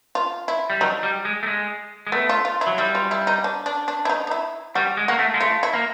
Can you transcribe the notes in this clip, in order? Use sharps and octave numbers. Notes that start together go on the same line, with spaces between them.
F4
E4
G3
F#3 D#4
G3
G#3
A3
G#3
G#3
A3 B3
F4
F4
E4
F#3
G3 E4
F4
E4
D#4
D4
D4
D4
E4
D#4
D#4
E4
G3 F#4
G#3
A#3 F#4
A3
G#3
A3 F4
E4
A#3